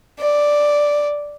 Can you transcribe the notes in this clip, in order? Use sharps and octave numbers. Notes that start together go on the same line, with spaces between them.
D5